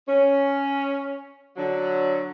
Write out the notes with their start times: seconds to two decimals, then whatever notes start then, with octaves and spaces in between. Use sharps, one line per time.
0.07 C#4
1.56 D3 F#3